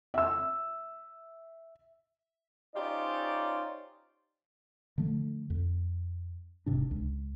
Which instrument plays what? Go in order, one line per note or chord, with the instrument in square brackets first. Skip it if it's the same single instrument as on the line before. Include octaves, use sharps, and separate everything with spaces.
[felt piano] E5 E6
[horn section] C#4 D#4 F4 G4 C5 D5
[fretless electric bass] D3 F3 A3
F2
E1 G#2 C3 D4
C#2